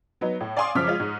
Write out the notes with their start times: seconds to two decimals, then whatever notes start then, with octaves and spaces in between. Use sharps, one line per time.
0.21 F#3 B3 D#4
0.40 A2
0.57 D5 F5 G#5 C6 D6 D#6
0.75 F#2 C#3 F3 D6 F6 B6
0.87 G#3 F4
1.00 G#2